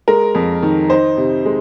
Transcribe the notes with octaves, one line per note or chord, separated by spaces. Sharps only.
G#3 A#4
F2
D#3
D#4 C5
C3
G#3